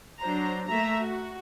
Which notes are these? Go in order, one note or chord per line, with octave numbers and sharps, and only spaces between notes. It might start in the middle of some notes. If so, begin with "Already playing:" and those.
F#3 D4 C5 A#5
A3 A#3 E5 A#5
F#4